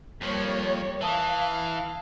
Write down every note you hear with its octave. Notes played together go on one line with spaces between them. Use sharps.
F2 F3 G3 A#3 C#5
E3 E5 F5 A5 D#6